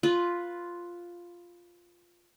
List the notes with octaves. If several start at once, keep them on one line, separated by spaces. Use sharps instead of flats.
F4 B4